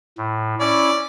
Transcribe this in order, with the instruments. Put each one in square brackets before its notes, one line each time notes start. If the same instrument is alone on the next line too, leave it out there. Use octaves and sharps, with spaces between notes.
[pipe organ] A2
[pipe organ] C#4 E4 [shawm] D5